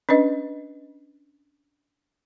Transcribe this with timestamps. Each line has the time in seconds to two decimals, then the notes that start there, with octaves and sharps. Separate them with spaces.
0.09 C#4 D4 B4 D#5